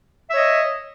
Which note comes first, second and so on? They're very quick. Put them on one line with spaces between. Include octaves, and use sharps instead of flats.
E5 C#5 D#5